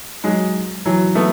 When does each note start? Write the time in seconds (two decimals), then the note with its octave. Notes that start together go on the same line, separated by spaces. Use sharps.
0.24 F#3 G#3
0.86 E3 F#3
1.15 A3 B3